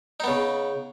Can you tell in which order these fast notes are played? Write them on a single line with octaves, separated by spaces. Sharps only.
D#4 B3 C#3